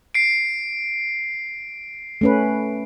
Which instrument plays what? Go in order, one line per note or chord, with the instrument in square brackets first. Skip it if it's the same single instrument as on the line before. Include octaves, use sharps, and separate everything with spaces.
[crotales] C7 D7
[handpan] A3 C#4 B4